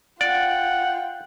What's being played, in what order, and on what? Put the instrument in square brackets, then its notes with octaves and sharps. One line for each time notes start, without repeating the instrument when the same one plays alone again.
[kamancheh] F4 G5 [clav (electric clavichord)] D5 [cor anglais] F#5